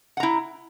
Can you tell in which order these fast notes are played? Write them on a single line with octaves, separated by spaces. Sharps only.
F#5 A#5 E4